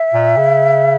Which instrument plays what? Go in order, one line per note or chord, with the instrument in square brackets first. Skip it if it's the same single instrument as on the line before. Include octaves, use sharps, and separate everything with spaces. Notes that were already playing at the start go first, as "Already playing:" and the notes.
Already playing: [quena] E5
[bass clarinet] A#2
C#3